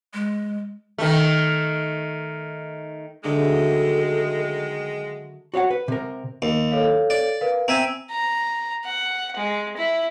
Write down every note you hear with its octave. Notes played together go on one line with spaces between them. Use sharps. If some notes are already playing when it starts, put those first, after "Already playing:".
G#3
D#3 A3
D3 D#3 F#3 G#3 A3 D4 G#4 A4
F#4 C#5 F5 F#5
B4
C3 A#4
D#2
A4 C#5 F5
D5
A#4 B4 F5
C4 E5 G5 G#5 A#5
A#5
F#5
G#3
E4